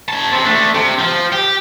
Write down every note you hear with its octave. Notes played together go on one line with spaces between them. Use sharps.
C#4 A5
C3 C4
A3 D4
C3
F3
G4